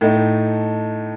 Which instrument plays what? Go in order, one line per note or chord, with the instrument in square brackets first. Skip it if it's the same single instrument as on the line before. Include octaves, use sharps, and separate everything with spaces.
[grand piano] A2 A3 D#4